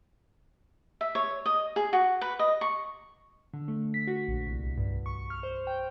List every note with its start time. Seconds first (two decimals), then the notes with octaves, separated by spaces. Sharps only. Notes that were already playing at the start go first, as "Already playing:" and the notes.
1.01 E5
1.15 C#5
1.46 D#5
1.76 G#4
1.93 F#4
2.21 B4
2.39 D#5
2.61 C#6
3.54 D3
3.68 A3
3.94 B6
4.07 F#4
4.28 A#1
4.47 C2
4.62 C2
4.78 G2
5.06 C#6
5.30 F6
5.43 C5
5.67 G5